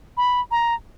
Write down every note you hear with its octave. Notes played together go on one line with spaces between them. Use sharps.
B5
A#5